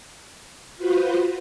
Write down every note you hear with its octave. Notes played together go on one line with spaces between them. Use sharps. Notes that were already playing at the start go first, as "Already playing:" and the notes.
F4 F#4 B4 C5